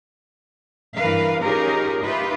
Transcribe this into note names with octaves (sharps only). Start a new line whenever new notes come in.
G2 E3 A#4 B4 F5
C#4 D#4 F4 G4 G#4 A#4
D#4 F4 G4 B4 E5